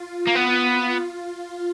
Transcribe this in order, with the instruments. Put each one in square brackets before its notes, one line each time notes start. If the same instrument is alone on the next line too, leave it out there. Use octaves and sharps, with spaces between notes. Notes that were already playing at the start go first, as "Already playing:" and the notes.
Already playing: [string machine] F4
[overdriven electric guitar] A#3
B3